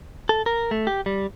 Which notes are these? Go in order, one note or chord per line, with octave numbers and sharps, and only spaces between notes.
A4
A#4
A3
G4
G3